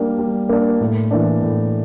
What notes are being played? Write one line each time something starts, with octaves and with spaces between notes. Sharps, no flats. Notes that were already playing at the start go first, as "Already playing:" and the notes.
Already playing: G3 A#3 D4
G3
A#3 D4
A2
E3 A#3 D4
A2